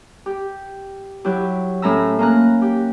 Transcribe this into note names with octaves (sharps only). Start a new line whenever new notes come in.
G4
F#3 E4 G4
A2 A3 C#4 E4 A#5 E6
A#3 C#4 A#5 F#6
G4